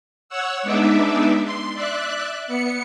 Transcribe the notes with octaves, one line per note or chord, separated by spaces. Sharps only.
C#5 F#5 E6
G#3 B3 D4 D#4 D5 E5
C6
D5 E5 F#6
B3 C#7